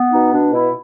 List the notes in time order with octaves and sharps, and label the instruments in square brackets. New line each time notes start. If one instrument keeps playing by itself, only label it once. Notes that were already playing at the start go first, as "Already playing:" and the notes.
Already playing: [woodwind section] B3
B2 D#4
B2 D4
B2 E4